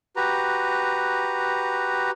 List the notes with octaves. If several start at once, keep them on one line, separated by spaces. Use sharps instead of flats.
F#4 G4 B4 A#5